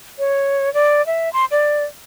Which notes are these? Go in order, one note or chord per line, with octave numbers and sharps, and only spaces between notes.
C#5
D5
E5
C6
D5